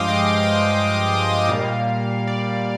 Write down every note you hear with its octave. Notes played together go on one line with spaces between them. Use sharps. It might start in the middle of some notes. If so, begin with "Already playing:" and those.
Already playing: G2 F3 G#3 F5 G5 C6 D6 D#6
D#5
F5
G5
F5
A#2 G3 A#3
D5